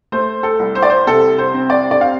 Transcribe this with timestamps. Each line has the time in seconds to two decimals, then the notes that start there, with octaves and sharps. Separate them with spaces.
0.12 A3 C5
0.43 A4
0.59 C2
0.75 C5
0.82 D5
0.90 C5
1.07 C3 A4
1.39 C5
1.54 C4
1.70 D5
1.91 D5
2.01 C4 F5